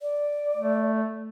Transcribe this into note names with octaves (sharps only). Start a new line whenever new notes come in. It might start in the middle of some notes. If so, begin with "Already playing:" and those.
D5
A3